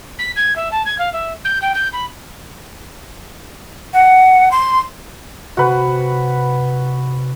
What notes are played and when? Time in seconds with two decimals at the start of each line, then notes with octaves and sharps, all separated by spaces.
0.19 B6
0.36 G#6
0.56 E5
0.72 A5
0.86 G#6
0.99 F5
1.13 E5
1.45 G6
1.62 G5
1.75 G6
1.93 B5
3.94 F#5
4.52 C6
5.57 C3 F#4 B4